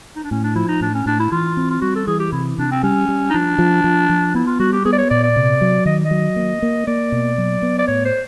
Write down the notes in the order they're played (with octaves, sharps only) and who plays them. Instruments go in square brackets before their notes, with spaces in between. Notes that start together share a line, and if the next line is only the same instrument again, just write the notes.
[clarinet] D#4
D4
[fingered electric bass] A2 [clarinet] C#4
[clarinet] D4
[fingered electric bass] F3 [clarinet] E4
[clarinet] D#4
[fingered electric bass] A2 [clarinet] D4
[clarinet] C#4
[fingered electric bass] A2 [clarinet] D4
[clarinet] E4
[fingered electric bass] E3 [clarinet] F4
[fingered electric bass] C4
[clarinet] F4
[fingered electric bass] G3 [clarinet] F#4
[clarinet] A4
[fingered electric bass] E3 [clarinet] G#4
[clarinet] G4
[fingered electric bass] C3 [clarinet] E4
[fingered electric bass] C3 [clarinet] D4
[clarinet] C4
[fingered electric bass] G3 [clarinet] C#4
[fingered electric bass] G3
[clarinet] D#4
[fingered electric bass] F3 [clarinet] D4
[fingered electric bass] F3
F3
F3
[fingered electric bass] B3 [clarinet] E4
[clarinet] F4
[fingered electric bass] G3 [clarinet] F#4
[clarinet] G4
[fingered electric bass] B3 [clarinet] G#4
[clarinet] D5
C#5
[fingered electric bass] A#2 [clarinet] D5
[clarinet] D5
[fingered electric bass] C3
F#3
[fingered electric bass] D#3 [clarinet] D#5
[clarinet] D#5
[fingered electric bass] F#3
A#3
A#3
[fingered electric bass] A#3 [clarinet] D5
[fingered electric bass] B2
F#3
B3
[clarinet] D5
[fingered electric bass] A2 [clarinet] C#5
[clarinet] C5